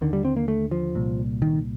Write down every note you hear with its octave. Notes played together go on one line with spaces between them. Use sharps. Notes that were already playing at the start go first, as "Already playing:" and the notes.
D#2 D3 D#3
G3
C4
A#3
A3
F3
C2 A#2
D#3